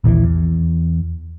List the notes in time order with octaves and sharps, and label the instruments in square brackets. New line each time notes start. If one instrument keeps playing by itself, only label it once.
[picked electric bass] A#1 D#2 D3 E3
E2